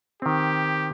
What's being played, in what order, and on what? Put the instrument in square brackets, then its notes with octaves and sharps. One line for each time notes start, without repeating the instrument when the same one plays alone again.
[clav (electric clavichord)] D#3 C4 [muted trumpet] G4